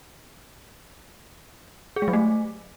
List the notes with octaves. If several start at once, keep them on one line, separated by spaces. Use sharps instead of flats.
G#4
G#3
F#3
A3